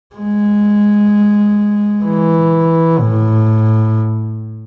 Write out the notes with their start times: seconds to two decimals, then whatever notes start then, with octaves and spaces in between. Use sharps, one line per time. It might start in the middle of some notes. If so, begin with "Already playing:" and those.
0.15 G#3
2.04 E3
2.99 A2